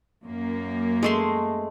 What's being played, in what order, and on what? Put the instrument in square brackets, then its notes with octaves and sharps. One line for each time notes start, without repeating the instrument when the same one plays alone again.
[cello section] F#2 A#3
[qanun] G#3 A3 C6